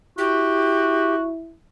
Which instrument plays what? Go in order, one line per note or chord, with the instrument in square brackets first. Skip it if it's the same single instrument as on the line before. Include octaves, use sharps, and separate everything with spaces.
[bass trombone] E4 [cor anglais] F#4 [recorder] G4